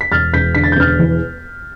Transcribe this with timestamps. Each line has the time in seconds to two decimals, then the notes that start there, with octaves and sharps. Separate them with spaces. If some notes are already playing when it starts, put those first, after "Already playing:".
0.01 B6
0.11 E1 F6 A6
0.33 E1 G6 B6
0.55 D3 B6
0.64 A6
0.72 G6
0.76 E1 F6 A6
0.99 E2